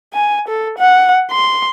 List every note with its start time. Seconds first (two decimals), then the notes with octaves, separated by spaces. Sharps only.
0.14 G#5
0.48 A4
0.78 F#5
1.31 C6